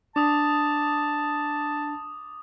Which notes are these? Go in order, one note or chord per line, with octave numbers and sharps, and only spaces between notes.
D4 A5 D6 D#6